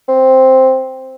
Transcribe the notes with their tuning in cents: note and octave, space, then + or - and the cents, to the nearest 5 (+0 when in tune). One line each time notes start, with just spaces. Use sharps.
C4 +0